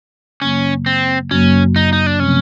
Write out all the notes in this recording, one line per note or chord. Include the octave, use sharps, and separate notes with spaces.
F#2 C#3 F#3 A#3 C#4
C4
F#2 C#3 F#3 A#3 C#4
D#4
D#4
D4
C3 F3 A3 C4 C#4